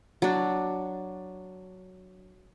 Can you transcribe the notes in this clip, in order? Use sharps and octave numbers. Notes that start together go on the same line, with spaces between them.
F#3 D4